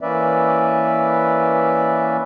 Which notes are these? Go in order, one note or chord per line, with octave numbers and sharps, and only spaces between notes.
E3 A#3 C#4 B4 D5 E5